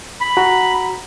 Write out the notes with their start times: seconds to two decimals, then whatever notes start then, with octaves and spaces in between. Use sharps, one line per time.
0.20 B5
0.37 F#4 A#5